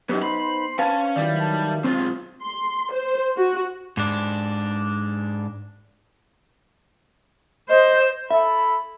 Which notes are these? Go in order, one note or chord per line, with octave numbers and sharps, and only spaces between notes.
F#2 B3 D#4 G4
C5 B5 C6
C#4 B4 F5 A5
D#3 F#3 G3 E4 D5
A5
B1 G#3 C4 F4
C6
C5
F#4
G#2 D4
C5 D#5
E4 A4 E5 B5